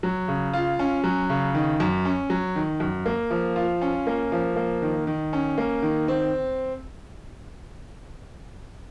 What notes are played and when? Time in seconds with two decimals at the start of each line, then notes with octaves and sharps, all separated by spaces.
0.03 F#3
0.28 C#3
0.53 F4
0.79 C#4
1.04 F#3
1.30 C#3
1.54 D#3
1.80 F#2
2.05 C#4
2.30 F#3
2.56 D#3
2.80 F#2
3.06 A#3
3.30 F3
3.56 F4
3.81 C#4
4.07 A#3
4.32 F3
4.56 A#3
4.82 D#3
5.07 D#3
5.33 C#4
5.58 A#3
5.82 D#3
6.08 C4